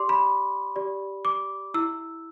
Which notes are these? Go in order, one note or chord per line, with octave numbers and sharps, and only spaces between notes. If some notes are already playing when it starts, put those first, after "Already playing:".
Already playing: G4 D5 C6 D6
B5
G4 D5
D6
E4 E6